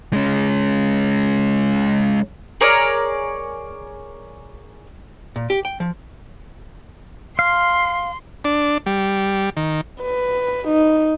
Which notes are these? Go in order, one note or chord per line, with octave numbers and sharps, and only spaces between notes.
G#3 C#4
G#4 A#4 C#5 D5
A#2
G4
G5
F3
F5 C6
D4
G3
D#3
B4
D#4